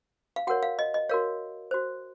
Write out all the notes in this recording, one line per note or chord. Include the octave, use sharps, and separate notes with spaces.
F5
F#4 A#4 C#5 F#5
F5
D#5
D#5
F#4 A#4 C#5 F5
F#4 C5